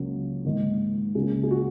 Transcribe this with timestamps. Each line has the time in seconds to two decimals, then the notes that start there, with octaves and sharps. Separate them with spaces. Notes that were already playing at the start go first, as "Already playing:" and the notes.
Already playing: C#2 C#3 F#3 A#3
0.45 G#2 D#3 A#3
1.15 C#2 C#3 A#3 G#4
1.43 G#4
1.51 F#4